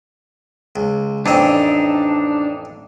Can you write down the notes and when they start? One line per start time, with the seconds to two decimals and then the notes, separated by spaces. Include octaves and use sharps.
0.76 C#2
1.26 A1 F2 C4 D4 D#4